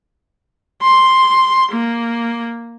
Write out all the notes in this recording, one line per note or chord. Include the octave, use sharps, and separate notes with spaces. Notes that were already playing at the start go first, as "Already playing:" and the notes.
C6
A#3